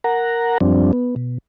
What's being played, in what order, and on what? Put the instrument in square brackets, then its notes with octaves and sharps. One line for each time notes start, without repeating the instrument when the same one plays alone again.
[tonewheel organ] A#4 F#5 A#5
F#2 F3 G3 C4 D4
B3
B2